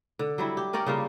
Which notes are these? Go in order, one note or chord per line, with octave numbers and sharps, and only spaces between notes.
D3
F#3 G3 E4
G4
C#4 A#4 D5 G5
C#3 G3 A#3 F4